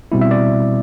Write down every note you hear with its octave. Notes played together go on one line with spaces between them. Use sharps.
B2 G3 C4 E4
E5
D5